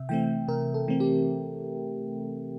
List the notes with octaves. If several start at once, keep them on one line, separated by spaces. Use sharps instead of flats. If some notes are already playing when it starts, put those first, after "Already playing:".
Already playing: C3 E5
E3 A3 C4 G5
C3 A#4
A4
E3 A3 C4
G4